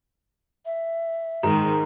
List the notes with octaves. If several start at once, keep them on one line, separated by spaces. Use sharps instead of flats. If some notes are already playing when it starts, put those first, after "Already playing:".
E5
G#2 D#3 A#4 A#5